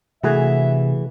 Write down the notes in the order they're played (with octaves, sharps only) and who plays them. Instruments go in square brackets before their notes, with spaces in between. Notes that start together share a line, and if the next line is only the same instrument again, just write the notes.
[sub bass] C3 [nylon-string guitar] E3 A3 [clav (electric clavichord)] F#4 G#4 [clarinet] E5